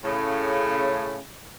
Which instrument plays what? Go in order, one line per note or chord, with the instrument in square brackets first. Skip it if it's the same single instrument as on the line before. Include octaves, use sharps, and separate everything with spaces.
[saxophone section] A2 C#3